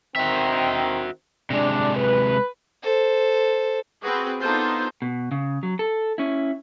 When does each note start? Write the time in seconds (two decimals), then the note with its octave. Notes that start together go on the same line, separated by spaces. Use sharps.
0.16 D#3 C4 F#4 E5
1.50 C3 G#3 D4
1.95 B4
2.83 A4 C5
4.02 C4 F#4 G#4 B4
4.41 B3 D4 D#4 F4 A4 C5
5.02 B2
5.31 C#3
5.63 F#3
5.79 A4
6.18 C#4 E4